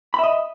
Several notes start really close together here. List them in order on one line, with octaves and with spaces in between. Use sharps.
B5 E5 D#5